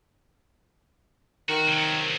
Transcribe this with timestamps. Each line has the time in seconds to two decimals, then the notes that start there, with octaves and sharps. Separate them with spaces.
1.49 D#3 F#4
1.67 C3 F#3